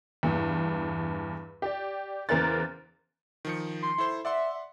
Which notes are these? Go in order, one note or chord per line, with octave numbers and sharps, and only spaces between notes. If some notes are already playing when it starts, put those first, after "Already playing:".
E2 G2
G4 D5
E2 C#3 A#4 C5 F#6 A6
D#3 F3 C#7
C6
E4 A4 C5
D5 E5 F#5 C6